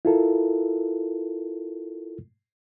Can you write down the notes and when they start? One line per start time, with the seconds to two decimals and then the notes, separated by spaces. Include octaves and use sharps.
0.05 E4 F4 A4 A#4